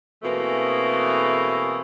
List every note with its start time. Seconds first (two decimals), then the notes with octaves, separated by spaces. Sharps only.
0.23 B2 E3 A3 A#3 C4 G#4